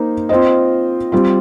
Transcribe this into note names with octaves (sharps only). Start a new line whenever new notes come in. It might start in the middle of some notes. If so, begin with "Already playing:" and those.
Already playing: A#3 D#4 C5
C4 F4 C5 D#5
G3 C4 F4